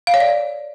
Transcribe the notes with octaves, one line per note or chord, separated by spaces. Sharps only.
F5
C#5
D5